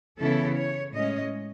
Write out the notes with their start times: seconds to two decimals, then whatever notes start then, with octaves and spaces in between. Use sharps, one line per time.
0.19 C#3 E3 B3 E4 A4
0.57 C#5
0.93 A2 G#3 C#4 D#5